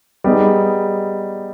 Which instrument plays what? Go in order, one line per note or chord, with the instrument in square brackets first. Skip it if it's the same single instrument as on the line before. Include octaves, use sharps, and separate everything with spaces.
[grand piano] G3 B3 D#4 G#4